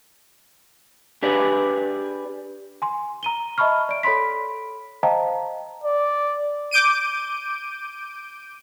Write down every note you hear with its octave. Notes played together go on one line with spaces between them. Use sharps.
D4 G4 G#4 B4 D5
G#5 C6
A#5 D#7 G7
D#5 E5 A5 B5 C#6 F6
D5 D7
A4 C#5 B5 C6 B6
C5 D#5 F5 G5 A5 A#5
D5
D6 G6 D7 D#7